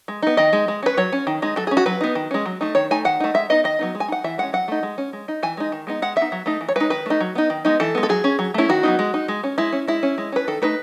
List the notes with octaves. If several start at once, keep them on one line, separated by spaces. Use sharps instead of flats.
G#3
B3 D#4
D#3 D#5
G#3 D#4
G#3
C#4 B4
F#3 C#5
C#4
D#3
G#3 D#4
F#3 A4
G#4
C#4
F#4
F#3 B4
B3 D#4
D#3
G#3 C#4
F#3
A3 D#4
D#3 C#5
A3 D#4 G#5
D#3 F#5
A3 D#4
G#3 E5
B3 D#4 D#5
D#3 D#5
F#3 B3 D#4
G#3
G#5
D#4 F#5
E3 E5
G#3 C#4 F#5
F#3 F#5
A3 D#4
G#3
C#4
G#3
D#4
E3 G#5
G#3 D#4
D#3
G#3 B3 D#4
G#3 F#5
B3 E5
D#4
F#3
A3 D#4
E3
C#5
G#3 D#4 B4
D#3 B4
A3 D#4
F#3
B3 D#4
D#3
G#3 B3 D#4
E3 A4
G#3 B3
A4
F#3 G#4
C#4
F#3
A3 C#4 E4
D#3 F#4
F#3 B3 D#4
G#3
D#4
G#3
C#4
G#3 E4
C#4
G#3 E4
C#4
G#3
C#4 B4
D#3 A4
A3 D#4 B4